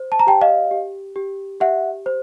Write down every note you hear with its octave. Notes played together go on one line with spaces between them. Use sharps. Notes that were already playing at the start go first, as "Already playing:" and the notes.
Already playing: C5
A5
A#5
G4 G5 A5
D#5 F5
G4
G4
G4 E5 F#5
C5